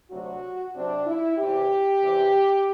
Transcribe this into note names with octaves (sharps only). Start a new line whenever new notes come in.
D2 C3 F#3 F#4
C3 F#3 C4 D4
E4
E2 C3 E3 G4
E2 C3 E3